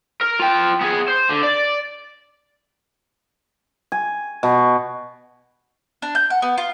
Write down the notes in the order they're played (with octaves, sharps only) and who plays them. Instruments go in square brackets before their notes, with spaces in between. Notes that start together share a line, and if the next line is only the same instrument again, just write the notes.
[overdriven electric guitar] A#4
F4 G5
B3 G#4
C5
D3
D5
[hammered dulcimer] G#5
B2
[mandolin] D4
G6
F#5
B3
F4